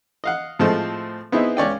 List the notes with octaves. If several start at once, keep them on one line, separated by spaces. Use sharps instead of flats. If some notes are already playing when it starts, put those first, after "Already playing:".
D#5 F5 F#5
A2 F3 G#3 A3 C4
B3 C4 D#4 E4 G#4
C#2 C#4 D5 G5